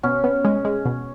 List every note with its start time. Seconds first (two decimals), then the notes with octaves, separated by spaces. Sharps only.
0.03 B2 C#4
0.24 B3
0.45 G#3
0.65 G#3
0.86 B2